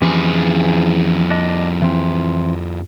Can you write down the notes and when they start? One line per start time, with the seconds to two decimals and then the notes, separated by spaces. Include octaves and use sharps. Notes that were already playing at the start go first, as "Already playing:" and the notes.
0.02 F2 E3 C#4 G4 G#4
1.30 D4 D#5
1.82 E3 C4